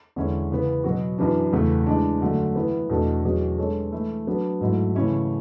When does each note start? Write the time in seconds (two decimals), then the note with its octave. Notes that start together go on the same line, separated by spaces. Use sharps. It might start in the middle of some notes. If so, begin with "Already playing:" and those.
0.16 E2 D3 G#3 C#4 E4
0.50 C#3 E3 B3
0.84 B2 F#3 B3 F#4
1.18 F#2 E3 B3 D4
1.53 E2 C#3 E3 A3 E4
1.87 E3 G#3 D4
2.21 F#2 D3 A3
2.55 E3 B3 E4
2.90 E2 B2 A3 D4 A4
3.24 E2 B2 F#3 C#4 G#4
3.58 G#3 D4 A4 C#5
3.92 E3 A3 E4
4.27 F#3 B3 D4
4.61 G#2 F#3 A3 E4
4.95 C#3 E3 A3 C#4 E4